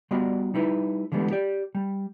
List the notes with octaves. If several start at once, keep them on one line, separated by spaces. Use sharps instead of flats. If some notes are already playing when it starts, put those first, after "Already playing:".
G3 B3 F4 F#4 D5 D#5
G3 D#4 E4 B4
D3 E3 G3 G#3 B3
G4 D5
G3